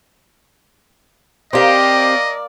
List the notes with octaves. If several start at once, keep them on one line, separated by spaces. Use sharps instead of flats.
A#3 C4 G4 A#4 D5 D#5